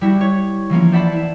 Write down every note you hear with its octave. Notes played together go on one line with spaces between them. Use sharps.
G3 E4 F#4
C#5 C#6
E3 F3 A#3 C#4
C5 D5 E5 F#5 A5 B5
E4 E7